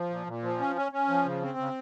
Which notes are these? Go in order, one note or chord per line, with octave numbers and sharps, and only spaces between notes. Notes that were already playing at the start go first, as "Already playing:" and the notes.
Already playing: F3
A#2
A#2
F3
C#4
C#4
C#4
F3
C#3
C4
C#3